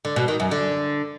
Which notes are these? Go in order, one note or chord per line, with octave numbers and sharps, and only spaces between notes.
D3
B2
D#3
F#2
D3